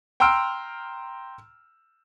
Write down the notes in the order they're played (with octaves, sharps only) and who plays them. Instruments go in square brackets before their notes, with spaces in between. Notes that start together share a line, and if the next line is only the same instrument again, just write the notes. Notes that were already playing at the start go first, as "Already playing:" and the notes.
[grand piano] G5 A#5 C6 E6 F6 D7